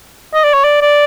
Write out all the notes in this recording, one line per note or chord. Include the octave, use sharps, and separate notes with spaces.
D#5
D5
C#5
D5
D5